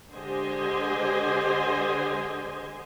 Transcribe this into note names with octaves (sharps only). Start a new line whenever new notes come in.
D3 G#3 G4 C5 D#5 G#5